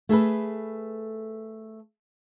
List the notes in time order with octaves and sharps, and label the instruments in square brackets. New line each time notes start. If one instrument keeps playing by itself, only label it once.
[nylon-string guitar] A3 G#4 A4 B4